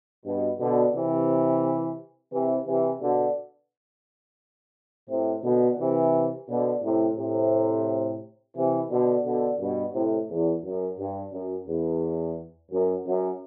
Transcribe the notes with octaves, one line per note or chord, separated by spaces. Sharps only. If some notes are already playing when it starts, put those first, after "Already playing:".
G2 B2
B2 D3
C3 E3
C3 E3
C3 E3
B2 D3
A2 C3
B2 D3
C3 E3
B2 D3
A2 C3
A2 C3
C3 E3
B2 D3
B2 D3
G2 B2
A2 C3
E2
F#2
G2
F#2
E2
F#2
F#2